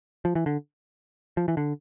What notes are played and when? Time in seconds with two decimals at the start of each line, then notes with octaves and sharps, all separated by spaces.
0.25 F3
0.35 E3
0.46 D3
1.37 F3
1.48 E3
1.57 D3